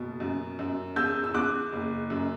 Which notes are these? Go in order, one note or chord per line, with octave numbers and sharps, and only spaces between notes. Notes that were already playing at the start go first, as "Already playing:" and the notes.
Already playing: F#1 B2
F#2
F#2
E2 E6 G6
E6
E2 D6 F#6
F#1
F#2